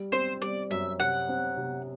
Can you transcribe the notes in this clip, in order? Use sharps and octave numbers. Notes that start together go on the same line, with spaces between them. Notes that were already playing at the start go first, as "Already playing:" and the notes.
Already playing: G3
C4 C5
G3 D5
F#2 E5
C3 F#5
C4
C3